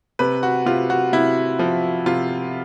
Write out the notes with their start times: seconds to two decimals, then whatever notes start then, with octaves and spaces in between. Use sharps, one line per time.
0.19 C3 B4
0.43 F#4
0.66 C3 F4
0.90 F#4
1.13 C3 E4
1.59 F3
2.06 C3 F4